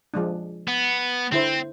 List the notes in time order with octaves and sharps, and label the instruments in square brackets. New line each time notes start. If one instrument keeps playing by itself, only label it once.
[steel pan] F3 G#3 D4
[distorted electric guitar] B3
[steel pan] D3 E4 C5 [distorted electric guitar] C4